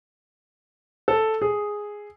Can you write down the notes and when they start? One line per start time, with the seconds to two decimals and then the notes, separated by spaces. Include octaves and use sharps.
1.08 A4
1.42 G#4